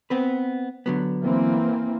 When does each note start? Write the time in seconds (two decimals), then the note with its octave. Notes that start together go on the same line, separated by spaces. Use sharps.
0.10 B3 C4 B4
0.86 D3 F#3 B3
1.22 E3 A#3 C4